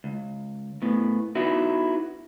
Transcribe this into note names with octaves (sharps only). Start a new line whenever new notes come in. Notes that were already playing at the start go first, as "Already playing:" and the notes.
C#2
A2 B3
B3 D#4 E4 F#4 B4